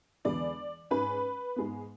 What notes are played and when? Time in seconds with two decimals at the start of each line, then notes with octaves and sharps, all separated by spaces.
0.25 E2 D3 G#3 B3 D5
0.91 G#2 G#3 C#4 B4
1.56 G#2 G#3 B3